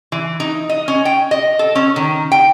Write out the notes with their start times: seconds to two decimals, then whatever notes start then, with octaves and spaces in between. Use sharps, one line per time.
0.12 E3
0.40 D#4
0.69 D#5
0.88 C#4
1.05 G5
1.31 D#5
1.59 A4
1.75 C#4
1.96 D#3
2.32 G5